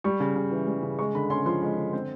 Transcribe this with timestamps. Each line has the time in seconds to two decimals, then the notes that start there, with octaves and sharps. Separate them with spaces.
0.04 G3 C#6
0.20 C#3
0.36 C#3
0.51 E3
0.67 G3
0.83 C#3
0.99 G#3 C#6
1.15 D3 B5
1.30 C#4 C6
1.46 F3 C6
1.62 G#3
1.77 D3
1.93 C4